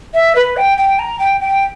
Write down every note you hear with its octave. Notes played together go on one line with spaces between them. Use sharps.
E5
B4
G5
G5
A#5
G5
G5